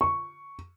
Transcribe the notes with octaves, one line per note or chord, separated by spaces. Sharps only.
C#6